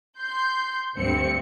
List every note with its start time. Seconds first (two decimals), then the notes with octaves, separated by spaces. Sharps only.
0.19 C6 G6
0.96 D2 G2 C4 C#7